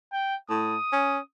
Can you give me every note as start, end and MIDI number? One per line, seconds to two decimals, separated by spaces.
0.12 0.35 79
0.50 0.76 45
0.50 1.22 87
0.92 1.19 61